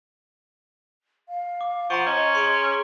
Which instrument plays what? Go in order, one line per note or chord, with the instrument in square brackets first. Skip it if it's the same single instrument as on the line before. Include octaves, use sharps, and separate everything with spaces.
[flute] F5
[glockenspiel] D6
[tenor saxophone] F3 [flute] F#5 [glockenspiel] A#5 C6 C#6
[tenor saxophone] C#4 [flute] D#5
[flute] G#4 [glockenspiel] C6 D7